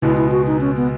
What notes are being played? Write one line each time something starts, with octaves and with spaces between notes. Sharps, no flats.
C#2 B2 G#3 E4
E4
F#4
D#4
C#4
B3